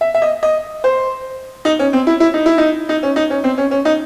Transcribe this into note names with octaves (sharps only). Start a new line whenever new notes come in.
E5
E5
D#5
D#5
C5
D#4
C#4
C4
E4
E4
D#4
E4
D#4
D#4
C#4
D#4
C#4
C4
C#4
C#4
D#4